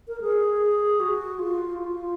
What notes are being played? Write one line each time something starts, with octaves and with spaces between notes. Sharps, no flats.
A#4
G#4
F#4
F4
F4